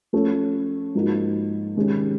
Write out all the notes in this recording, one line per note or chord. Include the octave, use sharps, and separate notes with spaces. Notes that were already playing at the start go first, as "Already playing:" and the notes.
F3 A3 C#4
G#2 F3 A#3 D#4 F#4
C3 D#3 G#3 C#4